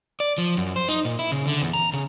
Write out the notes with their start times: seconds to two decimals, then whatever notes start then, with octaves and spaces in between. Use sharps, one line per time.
0.20 D5
0.38 F3
0.57 F#2
0.76 C5
0.89 D#4
1.05 A#2
1.19 E4
1.32 C#3
1.47 D3
1.62 E2
1.74 A#5
1.93 C#3